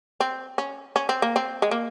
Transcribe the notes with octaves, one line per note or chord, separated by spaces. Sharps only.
C4
C#4
C#4
C4
A#3
C4
G#3
A#3